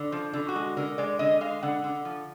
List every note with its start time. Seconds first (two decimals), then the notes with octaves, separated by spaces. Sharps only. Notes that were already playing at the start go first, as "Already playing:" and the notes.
Already playing: D3
0.12 F3
0.33 D3
0.48 F#4
0.55 G#3
0.77 D3 A#4
0.98 G#3 D5
1.19 D3 D#5
1.41 G#3 F5
1.63 D3 F#5
1.84 D3
2.05 F3